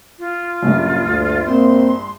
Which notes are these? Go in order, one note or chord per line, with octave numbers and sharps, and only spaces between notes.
F4
A#1 G2 A#2 C#3 F#3
D2
A#3 C4 C6